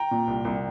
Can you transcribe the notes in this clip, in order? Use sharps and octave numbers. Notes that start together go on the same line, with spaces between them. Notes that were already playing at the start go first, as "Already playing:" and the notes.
Already playing: G5 A#5
A#2
C2
C2